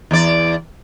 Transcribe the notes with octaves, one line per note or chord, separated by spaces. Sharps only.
E2 D5